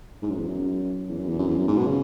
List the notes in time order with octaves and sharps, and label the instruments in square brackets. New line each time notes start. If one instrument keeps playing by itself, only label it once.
[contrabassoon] G#2
F#2
E2
F#2
E2
F#2
E2
F#2
E2
F#2
G#2
B2
C#3